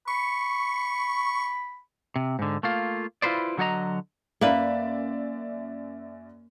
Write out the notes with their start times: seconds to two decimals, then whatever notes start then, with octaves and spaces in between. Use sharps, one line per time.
0.08 B5 C#6
2.16 C3
2.39 G#2 D3
2.63 A3 A#3 F4
3.22 E4 F4 A4 B4 C5 D5
3.57 D3 F#3 F#4 C#5 D#5 A#5
4.41 F#2 A#3 B4 D5 E5